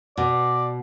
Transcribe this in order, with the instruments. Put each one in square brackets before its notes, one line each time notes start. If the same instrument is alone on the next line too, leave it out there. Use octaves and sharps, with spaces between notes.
[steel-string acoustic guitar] B2 [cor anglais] D5